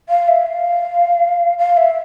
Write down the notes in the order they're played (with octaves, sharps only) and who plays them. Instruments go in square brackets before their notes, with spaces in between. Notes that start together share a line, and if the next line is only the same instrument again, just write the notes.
[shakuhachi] F5
E5
F5
F5
E5